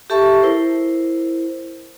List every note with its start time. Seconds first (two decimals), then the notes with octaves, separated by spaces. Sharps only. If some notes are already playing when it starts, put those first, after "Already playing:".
0.10 G4 A4 E5 A5 C#6
0.42 E4 A#4 C5